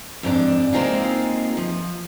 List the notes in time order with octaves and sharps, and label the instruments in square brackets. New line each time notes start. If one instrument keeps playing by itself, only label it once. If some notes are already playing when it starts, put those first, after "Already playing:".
[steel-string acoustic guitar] F2 G#2 D4
G#3 A#3 C4 D#4 F4 G#4
F3